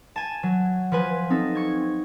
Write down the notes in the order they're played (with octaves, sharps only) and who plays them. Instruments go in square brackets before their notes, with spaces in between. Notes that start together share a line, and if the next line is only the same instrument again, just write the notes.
[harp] G#5 A5
F#3
F3 B4 G#5
[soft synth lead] C4 [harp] D#4 A4
[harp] C#6 G#6